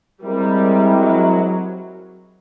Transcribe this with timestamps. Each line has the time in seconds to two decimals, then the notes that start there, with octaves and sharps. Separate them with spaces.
0.22 G3 G#3 C4 E4 G4 A#4
0.98 F#3